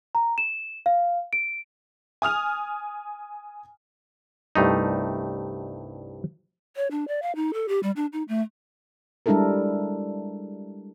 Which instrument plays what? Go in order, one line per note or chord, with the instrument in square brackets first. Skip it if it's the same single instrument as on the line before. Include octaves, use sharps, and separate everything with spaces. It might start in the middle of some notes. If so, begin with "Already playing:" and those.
[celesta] A#5
E7
F5
D7
[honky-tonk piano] G#5 D#6 F6 F7
[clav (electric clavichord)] C2 G2 A3 D#4
[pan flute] C#5
D4
D5
F5
D#4
A4
G4
G3
D4
D#4
A3
[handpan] G3 G#3 D4 E4 A4 A#4